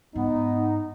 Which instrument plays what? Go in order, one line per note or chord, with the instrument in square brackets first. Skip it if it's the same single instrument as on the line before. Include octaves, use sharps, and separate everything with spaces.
[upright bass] G#2 [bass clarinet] B3 [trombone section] D#4